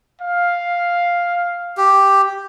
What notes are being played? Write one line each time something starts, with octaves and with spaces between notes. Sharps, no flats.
F5
G4